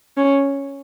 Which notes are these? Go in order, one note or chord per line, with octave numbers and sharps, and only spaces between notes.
C#4